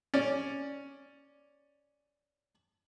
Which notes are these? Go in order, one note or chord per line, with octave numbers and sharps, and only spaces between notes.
C#4 D5